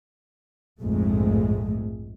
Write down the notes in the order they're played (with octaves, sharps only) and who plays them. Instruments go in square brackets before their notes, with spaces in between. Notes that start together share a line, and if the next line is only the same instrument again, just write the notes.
[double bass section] A#1 F2 G#2 G#3 A3